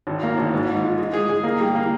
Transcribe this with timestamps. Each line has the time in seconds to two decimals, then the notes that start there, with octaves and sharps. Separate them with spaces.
0.07 G#1
0.23 A#3
0.38 G#1
0.54 G#2
0.68 G#2
0.83 F4
0.98 G#3
1.14 G#4
1.29 G#4
1.44 A#3
1.60 G3
1.75 A#3